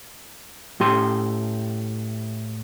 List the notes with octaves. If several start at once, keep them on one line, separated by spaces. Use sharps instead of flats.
A2 G4 C6